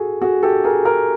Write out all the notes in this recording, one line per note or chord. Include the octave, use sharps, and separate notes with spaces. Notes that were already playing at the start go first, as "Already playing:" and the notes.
Already playing: F#4 G#4 A4
F#4 G#4
G4 A4
G#4 A#4
G#4 A#4